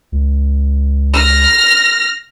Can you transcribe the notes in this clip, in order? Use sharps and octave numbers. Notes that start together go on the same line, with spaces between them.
C#2
F6 A#6